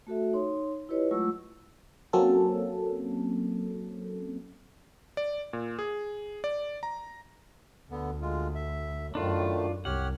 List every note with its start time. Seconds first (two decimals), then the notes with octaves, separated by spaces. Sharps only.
0.07 A3 F#4 A4 E5
0.33 D#4 C#5 C6
0.89 E4 F4 G4 B4 C#5 D#5
1.11 F#3 G#3 A3 F4 C#6 E6
2.13 F#3 A#3 C4 C#4 A4
5.17 D5
5.53 A#2
5.79 G#4
6.44 D5
6.83 A#5
7.91 D2 D3 B3
8.22 G#3 F4
8.55 E5
9.15 F#2 A2 D#3 A3 D4 F4
9.85 C2 G4 C#5 F#5 F6